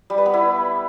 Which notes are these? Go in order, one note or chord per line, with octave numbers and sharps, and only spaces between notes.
G3
B4
B3
E4